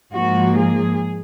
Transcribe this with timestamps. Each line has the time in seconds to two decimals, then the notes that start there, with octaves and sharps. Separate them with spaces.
0.12 G#2 F3 A#3 F#4
0.57 G#4